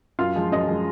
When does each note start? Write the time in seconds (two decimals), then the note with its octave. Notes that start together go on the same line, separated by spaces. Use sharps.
0.19 F#2 F4 F5
0.36 F3 G#3
0.52 F#2 D#5
0.68 F3 G#3